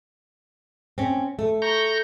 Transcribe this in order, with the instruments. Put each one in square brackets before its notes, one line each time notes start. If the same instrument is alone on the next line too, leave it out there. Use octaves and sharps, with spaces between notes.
[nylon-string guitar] C4 C#4
A3
[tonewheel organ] A#5 C#6 G6